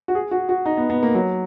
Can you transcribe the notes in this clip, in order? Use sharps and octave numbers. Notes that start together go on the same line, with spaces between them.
F#4
G#4
F#4
F#4
D#4
B3
B3
A#3
F#3